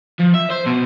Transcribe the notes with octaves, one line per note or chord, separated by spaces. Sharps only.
F3
E5
C5
B2